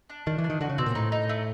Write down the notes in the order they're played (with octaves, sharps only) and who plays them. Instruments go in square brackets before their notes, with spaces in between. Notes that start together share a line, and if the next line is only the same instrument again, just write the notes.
[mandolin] D4
[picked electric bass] D#3 [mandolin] D4
[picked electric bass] E3
[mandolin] D4
[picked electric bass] D#3
[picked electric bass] D3 [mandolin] F#4
[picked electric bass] C#3
[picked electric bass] B2 [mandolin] C4
[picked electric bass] A#2
[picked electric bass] A2 [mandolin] D#4
[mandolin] D#4
A3